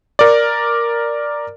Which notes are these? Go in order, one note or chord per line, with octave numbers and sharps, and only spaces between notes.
A#4 D5